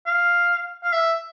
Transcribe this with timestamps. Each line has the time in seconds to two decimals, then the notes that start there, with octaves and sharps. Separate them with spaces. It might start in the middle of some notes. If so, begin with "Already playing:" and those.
0.06 F5
0.84 F5
0.93 E5